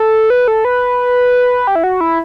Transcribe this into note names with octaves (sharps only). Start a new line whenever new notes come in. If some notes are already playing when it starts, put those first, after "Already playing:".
Already playing: A4
B4
A4
B4
G4
E4
F#4
E4